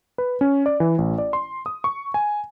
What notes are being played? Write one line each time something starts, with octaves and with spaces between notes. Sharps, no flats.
B4
C#4
D5
E3
A1
D5
C6
D#6
C#6
G#5